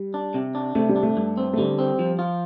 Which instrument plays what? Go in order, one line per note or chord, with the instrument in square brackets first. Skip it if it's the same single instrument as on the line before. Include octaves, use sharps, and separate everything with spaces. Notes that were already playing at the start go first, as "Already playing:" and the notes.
Already playing: [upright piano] G3
[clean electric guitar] D4
C3
D4
[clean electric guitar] C3 [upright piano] A3
[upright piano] G3
[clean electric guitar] D4
[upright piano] A3
[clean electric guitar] G2
C4
[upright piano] A3
[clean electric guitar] D3 [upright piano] G3
[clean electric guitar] C4
F3
F4